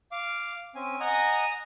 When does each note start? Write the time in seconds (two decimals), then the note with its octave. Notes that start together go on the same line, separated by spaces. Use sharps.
0.12 F5 D6
0.75 C4 C#4 G#5
1.00 D#5 F#5 G#5 A#5 D#6